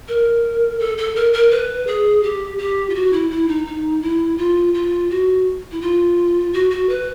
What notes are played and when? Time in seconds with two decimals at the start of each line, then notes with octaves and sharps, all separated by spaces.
0.08 A#4
0.79 A4
0.98 A4
1.16 A#4
1.33 A#4
1.51 B4
1.87 G#4
2.23 G4
2.58 G4
2.90 F4
2.95 F#4
3.13 E4
3.31 E4
3.48 D#4
3.67 D#4
4.02 E4
4.38 F4
4.74 F4
5.10 F#4
5.72 E4
5.82 F4
6.53 F#4
6.71 F#4
6.89 B4